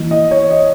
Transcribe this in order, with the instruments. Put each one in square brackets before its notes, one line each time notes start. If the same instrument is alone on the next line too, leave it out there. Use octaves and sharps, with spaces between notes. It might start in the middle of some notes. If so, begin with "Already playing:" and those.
Already playing: [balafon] E3 A#3 E4
[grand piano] D#5
C#5
D#5